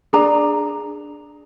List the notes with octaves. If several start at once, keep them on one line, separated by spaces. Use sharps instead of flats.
D4 G#4 A#5